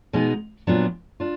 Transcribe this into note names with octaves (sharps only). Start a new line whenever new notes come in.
B2 G#3 B3 D#4
A#2 F#3 B3 D4 F4
D4 F4